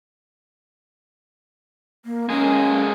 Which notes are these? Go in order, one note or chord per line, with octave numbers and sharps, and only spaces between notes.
A#3
G#3 A#3 C#4 G#4